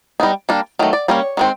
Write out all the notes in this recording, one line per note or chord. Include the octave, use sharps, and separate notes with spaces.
G3 B3 D#4
G3 A#3 D4
D#3 F#3 A3
D5
G3 A#3 C#4 C#5
D#3 G#3 C4